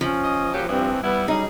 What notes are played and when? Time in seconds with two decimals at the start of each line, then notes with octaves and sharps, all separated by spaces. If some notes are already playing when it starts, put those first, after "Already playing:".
0.01 F3 C#4
0.24 D#5
0.54 F#3 A#3 C#4 G4
0.68 G2 E3 C4
1.03 G3 B3 E4
1.28 F#3 G3 C#4 D#4 G#4